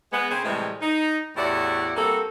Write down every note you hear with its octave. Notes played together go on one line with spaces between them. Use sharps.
G#3 B3
C#3 C4 G#4 C5
A2 C3 E3 G3 G#3
D#4
E2 A2 E4 F#4 G4 D5
G2 A#3 C4 F#4 A4